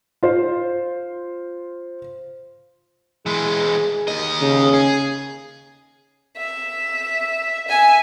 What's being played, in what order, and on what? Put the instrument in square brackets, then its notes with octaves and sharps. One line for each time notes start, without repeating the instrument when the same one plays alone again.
[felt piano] F4 C5
[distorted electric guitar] E3 G#3 [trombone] G#4
[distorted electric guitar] D#2 D#5
[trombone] C#3
[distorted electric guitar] G#4
[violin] E5
E5 G#5